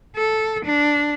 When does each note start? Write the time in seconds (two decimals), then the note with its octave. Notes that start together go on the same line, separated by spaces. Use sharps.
0.16 A4
0.65 D4